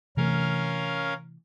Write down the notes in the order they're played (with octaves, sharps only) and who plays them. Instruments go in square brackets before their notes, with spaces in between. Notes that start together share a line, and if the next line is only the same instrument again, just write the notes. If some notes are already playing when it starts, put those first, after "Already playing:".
[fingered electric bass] C3 E3 A3 [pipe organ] C#4 A#4 F5